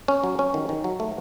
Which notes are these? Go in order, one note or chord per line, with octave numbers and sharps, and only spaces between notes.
C#4
F#3
C#4
D#3
D#3
F#3
A3